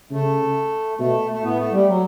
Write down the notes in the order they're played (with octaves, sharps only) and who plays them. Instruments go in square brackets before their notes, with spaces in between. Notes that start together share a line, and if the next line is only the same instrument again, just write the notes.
[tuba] C#3 [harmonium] A3
[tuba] B2 [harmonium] A3
[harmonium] A3
[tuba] A2 [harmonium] B3
[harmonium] A3
G3
F#3